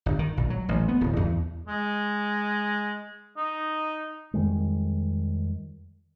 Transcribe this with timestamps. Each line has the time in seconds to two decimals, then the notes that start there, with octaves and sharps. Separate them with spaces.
0.06 G1
0.19 D#3
0.37 A#1
0.50 F#3
0.69 A1
0.88 B3
1.01 D1
1.16 E2
1.68 G#3
3.37 D#4
4.34 F2 D#3 G3 G#3